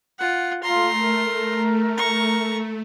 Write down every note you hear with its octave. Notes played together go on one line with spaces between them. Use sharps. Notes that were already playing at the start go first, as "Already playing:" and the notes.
F4 F#5
A3 F4 A#5 C6
A#4
A#5 C#6